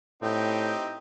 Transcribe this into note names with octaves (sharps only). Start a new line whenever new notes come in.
A2 C4 D#4 G4